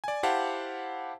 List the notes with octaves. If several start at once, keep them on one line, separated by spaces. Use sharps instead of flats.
D5 G#5
E4 G4 C5 F5 F#5 A5